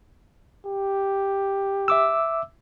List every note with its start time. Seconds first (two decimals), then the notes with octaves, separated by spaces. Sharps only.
0.66 G4
1.88 E5 D6 E6